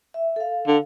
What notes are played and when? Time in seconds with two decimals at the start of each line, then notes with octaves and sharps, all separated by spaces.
0.14 E5
0.36 A4 F5
0.67 D3